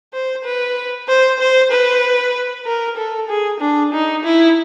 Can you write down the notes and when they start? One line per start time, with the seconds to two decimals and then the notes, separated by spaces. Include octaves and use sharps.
0.13 C5
0.44 B4
1.08 C5
1.39 C5
1.71 B4
2.66 A#4
2.97 A4
3.29 G#4
3.60 D4
3.93 D#4
4.24 E4